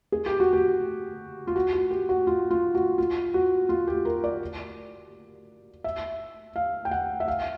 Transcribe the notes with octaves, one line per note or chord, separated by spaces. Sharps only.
G#4
G4
F#4
G4
F4
F#4
F#4
G4
F#4
F4
F4
F#4
F4
F#4
F4
G4
A#4
D5
E5
F5
G5
F#5
E5
F5